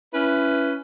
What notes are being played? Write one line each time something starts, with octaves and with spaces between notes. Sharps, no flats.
C#4 E4 B4